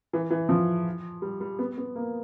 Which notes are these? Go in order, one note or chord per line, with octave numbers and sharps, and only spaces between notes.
E3
E3
F3
G3
G3
B3
B3
A#3